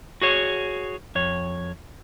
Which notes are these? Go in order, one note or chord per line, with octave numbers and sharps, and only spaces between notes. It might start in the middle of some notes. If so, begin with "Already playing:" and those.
F#4 G#4 C#5
F2 C#5